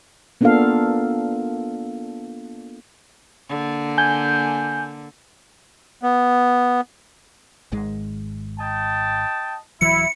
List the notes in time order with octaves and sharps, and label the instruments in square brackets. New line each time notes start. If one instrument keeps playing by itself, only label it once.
[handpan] A#3 B3 D4 F4 A4 F5
[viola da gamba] D3 A#3
[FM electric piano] G#5 G6
[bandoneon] B3
[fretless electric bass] G#1 G#2 G#3
[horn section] D#5 G5 A5
[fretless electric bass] D#1 E3 F#3 [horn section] E4 [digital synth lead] C#7